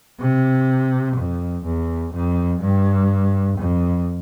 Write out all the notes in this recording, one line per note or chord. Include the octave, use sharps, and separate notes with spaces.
C3
F2
E2
F2
G2
F2